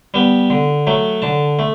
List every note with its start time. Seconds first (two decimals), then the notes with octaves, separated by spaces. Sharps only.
0.14 G3 B3
0.50 D3
0.87 F#3 A3
1.22 D3 A5
1.59 A3